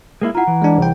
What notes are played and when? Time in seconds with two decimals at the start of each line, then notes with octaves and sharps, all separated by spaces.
0.22 G#3 A#3 E4
0.35 E4 F4 F#5 A#5
0.47 E3
0.62 G#3 D4
0.78 C2 G5